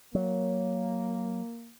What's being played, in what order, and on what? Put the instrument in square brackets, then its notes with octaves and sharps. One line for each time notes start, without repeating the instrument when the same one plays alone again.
[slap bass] F#3 [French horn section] A#3